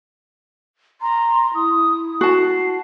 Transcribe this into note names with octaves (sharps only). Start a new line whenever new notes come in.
A#5 C6
E4 D#6
F#4 A5 C7